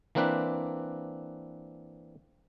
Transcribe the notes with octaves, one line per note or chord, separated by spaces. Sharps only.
E3 A#3 C4 D4 B4